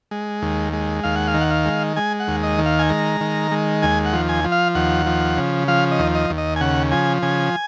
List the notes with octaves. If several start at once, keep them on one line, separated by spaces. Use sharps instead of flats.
G#3
D#2
G#3
D#2 F5
F#5
F5
D#3
F#5
F5
G#3
G#3 G#5
F#5
D#2
D#5
D#3
F5
G#5
G#3 A#5
D#3
G#3
D#2 G#5
F#5
F3
G#5
F3
F5
D#2 F#5
F3
C#3
F3 F5
D#5
D#2
D#5
D#2
D#5
G#5
C#3 F#5
F3 G#5
C#3 G#5